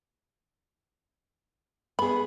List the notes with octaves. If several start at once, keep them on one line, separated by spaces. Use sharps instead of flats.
B3 G#4 B5